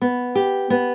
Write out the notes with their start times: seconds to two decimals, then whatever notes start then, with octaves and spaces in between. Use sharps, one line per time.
0.02 B3
0.35 G4
0.70 B3